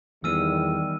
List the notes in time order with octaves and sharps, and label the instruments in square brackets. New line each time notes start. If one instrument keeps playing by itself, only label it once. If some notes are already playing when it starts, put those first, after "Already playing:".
[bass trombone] E2 [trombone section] D#3 G3 [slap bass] E3 B3 [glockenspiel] E6 F6 D#7